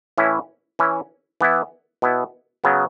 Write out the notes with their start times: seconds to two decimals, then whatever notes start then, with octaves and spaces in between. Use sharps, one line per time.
0.18 A2 E3 C#4 E4
0.79 E3 C#4 E4
1.41 E3 B3 E4
2.02 B2 B3 E4
2.64 C#3 F#3 B3